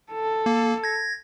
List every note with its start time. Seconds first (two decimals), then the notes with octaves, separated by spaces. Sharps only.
0.12 A4
0.46 A#3
0.84 G#6 A#6